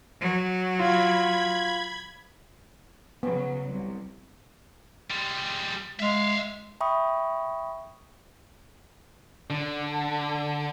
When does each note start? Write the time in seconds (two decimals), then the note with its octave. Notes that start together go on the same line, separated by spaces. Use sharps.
0.20 F#3
0.79 F4 B5 G#6
3.23 C#3 F#3 B3
3.69 C2
5.10 G3 G#3
6.00 G#3 E5 F5
6.81 E5 G5 B5 C#6 D#6
9.50 D3